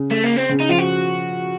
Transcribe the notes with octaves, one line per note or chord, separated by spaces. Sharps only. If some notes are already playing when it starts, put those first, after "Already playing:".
Already playing: C#3
A3
A#3
C4
C#3
D#4
F3 F4
F#4